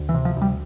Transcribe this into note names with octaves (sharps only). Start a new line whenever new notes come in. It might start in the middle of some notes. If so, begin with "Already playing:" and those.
Already playing: D2
E3
C3
F3
D2
G3